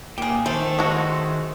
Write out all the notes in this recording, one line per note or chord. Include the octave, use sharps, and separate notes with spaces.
A#2 G4 G#4
D#3 A3 C5
G#3 F#4